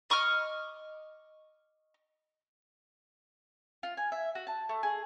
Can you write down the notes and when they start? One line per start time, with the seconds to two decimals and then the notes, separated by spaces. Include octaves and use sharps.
0.10 D#5 C#6 D6 F6
3.83 F4
3.97 G#5
4.12 E5
4.35 F#4
4.47 A5
4.69 A3
4.83 G#4